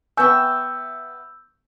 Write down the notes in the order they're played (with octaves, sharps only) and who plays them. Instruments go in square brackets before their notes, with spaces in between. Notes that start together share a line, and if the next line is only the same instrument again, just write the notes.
[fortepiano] B3 C#6 [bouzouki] E5 G5 [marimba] G#5 [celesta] E6 G6